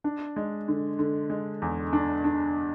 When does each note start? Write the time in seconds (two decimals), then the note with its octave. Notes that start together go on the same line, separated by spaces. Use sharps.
0.04 D4
0.36 G#3
0.68 D3
0.99 D3
1.30 G#3
1.62 E2
1.93 D4
2.24 D4